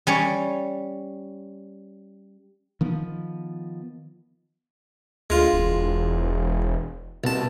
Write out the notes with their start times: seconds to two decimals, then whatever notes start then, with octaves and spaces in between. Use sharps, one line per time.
0.07 G3 C#4 C#5
2.81 D#3 F3 B3
5.30 D2 G#3 F4
5.53 E1
7.24 C2 B2 A5